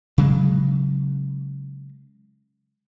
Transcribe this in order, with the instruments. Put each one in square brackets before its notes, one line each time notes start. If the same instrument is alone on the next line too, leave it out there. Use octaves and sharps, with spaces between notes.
[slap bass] C#3 F#3 G#3